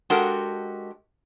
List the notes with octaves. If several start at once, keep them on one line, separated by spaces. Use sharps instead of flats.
G#3 D4 F#4 G4 A4 A#4